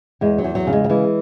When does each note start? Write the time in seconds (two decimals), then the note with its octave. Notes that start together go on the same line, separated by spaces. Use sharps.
0.21 E2 G#3
0.38 F#3
0.44 E2
0.55 F#3
0.67 C#3
0.73 G#3
0.84 F#3
0.89 E3 G#3